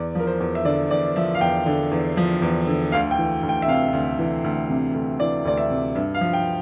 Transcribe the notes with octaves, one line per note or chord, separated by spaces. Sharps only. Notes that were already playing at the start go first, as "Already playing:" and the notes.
Already playing: E2 D5
F3 A#4
C5
E2
E5
D3 D5
E2 D5
F3 E5
F5
E2 G5
D3
E2
F3
E2
D3
D2 F5
G5
E3
D2
G5
E5
C3 F5
D2
E3
D2
C3
D2
E3 D5
D2 D5
E5
C3
G2 E5
F5
F3
G5